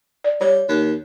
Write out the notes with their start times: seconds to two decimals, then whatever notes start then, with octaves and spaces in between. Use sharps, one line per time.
0.24 D5
0.41 G3 C#5
0.69 D#2